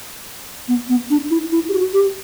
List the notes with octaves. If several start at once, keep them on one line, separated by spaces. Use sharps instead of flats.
B3
B3
D4
E4
E4
G4
F#4
G4